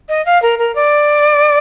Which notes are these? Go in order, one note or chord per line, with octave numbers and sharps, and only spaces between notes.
D#5
F5
A#4
A#4
D5